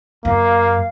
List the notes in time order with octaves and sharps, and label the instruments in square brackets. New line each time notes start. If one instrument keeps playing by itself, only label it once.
[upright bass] F#2 [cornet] A#3 [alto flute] F5